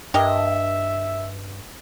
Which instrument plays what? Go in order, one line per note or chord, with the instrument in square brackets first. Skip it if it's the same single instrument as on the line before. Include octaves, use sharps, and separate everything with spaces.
[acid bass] G2 [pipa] G4 A#4 D#5 [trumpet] E5